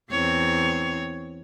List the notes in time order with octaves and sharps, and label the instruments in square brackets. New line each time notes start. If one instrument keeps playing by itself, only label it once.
[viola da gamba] E2 C4 C#5